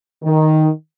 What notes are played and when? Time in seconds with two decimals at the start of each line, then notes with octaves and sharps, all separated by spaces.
0.24 D#3